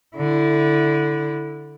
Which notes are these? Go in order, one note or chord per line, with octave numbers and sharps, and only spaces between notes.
D3 E4